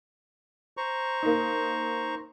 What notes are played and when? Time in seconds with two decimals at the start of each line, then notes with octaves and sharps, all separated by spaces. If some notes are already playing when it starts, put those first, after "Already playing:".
0.77 C5 A#5 C#6
1.23 A#3 D#4